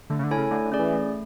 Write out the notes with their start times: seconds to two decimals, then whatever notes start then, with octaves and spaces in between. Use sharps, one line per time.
0.10 D3 A3
0.19 C#3
0.24 D3
0.31 E4 A4 C#5 G#5
0.37 C#3
0.51 D3 A3
0.65 D3
0.72 C#4 G#4 D5
0.79 E3
0.93 A3